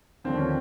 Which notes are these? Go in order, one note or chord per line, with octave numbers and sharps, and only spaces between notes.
D#2 D3 F3 C4
C#4